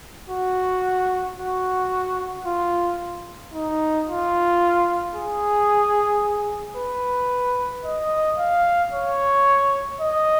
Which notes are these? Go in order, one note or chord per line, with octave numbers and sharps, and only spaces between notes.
F#4
F#4
F4
D#4
F4
G#4
B4
D#5
F5
C#5
D#5